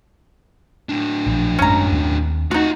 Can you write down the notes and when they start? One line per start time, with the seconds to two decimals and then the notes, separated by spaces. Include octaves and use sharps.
0.89 A2 D4
1.27 A#1 F3
1.59 G#1 F#2 G#3 C#4 A#5
1.91 D#2 C4
2.51 A3 C4 D#4 F4 F#4 F#5